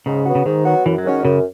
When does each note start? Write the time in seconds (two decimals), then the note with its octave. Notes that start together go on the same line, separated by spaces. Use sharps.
0.06 G#2 C#3
0.26 F#3 B3 F#4
0.35 C#3
0.46 G#2 D#3
0.65 F#3 B3 F#4
0.86 F#2 E3
0.98 F#3
1.05 D#3 G#3 C#4 F#4
1.24 F#2 C#3